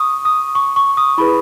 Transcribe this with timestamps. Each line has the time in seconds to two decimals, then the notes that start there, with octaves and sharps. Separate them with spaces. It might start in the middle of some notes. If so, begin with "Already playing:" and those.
Already playing: C#6 D#6
0.25 D#6
0.55 C#6
0.76 C#6
0.97 D#6
1.18 E4 G#4 B4 B5